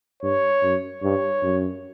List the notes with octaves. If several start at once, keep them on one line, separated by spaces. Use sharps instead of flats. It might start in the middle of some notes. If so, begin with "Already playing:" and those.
G2 C#5
F#2
G2 C#5
F#2